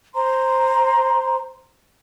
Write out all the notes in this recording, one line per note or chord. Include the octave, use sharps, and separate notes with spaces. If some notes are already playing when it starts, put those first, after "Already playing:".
C5 A#5 C6